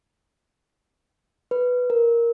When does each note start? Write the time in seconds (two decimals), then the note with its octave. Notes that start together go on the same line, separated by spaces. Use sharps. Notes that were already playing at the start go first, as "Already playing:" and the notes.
1.51 B4
1.90 A#4